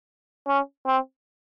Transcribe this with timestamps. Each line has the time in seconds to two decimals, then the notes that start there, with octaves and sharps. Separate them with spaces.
0.47 C#4
0.86 C4